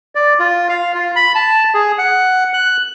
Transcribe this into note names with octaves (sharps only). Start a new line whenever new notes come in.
D5
F4
F5
F4
B5
A5
G#4
F#5
F#6